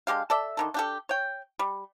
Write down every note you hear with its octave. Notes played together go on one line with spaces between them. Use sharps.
D3 G#3 G4 F5
A4 D5 E5
D3 D#3 A4
D4 G4 A4
C#5 G5
G3